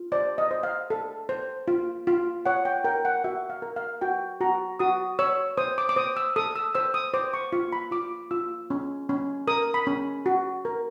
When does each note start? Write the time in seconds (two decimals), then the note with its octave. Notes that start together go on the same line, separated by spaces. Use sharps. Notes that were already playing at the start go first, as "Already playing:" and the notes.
Already playing: F4
0.12 C5 D5
0.38 D#5
0.51 C5
0.63 F5
0.90 A4
1.29 C5
1.68 F4
2.07 F4
2.46 C#5 F#5
2.65 G5
2.84 A#4 G5
3.05 F#5
3.24 F#4 E5
3.50 F5
3.62 A#4
3.76 F5
4.01 F#4 G5
4.41 F#4 A#5
4.80 F#4 D#6
5.19 C#5 E6
5.57 C5 D#6
5.78 D6
5.89 D6
5.96 C5 D#6
6.17 E6
6.36 A4 D#6
6.56 E6
6.75 C5 E6
6.94 D#6
7.14 C5 D6
7.34 C#6
7.52 F4 C#6
7.72 B5
7.91 F4 D6
8.31 F4 E6
8.70 C#4
9.09 C#4
9.47 A#4 D#6
9.74 B5
9.87 C#4
10.26 F#4
10.65 A#4